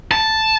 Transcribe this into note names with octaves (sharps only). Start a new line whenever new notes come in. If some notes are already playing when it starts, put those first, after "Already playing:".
A5